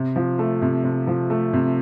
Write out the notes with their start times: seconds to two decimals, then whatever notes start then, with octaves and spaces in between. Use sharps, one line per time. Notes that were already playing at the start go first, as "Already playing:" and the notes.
Already playing: C3
0.16 F3
0.39 A3
0.62 C3
0.84 C3
1.07 F3
1.30 A3
1.53 C3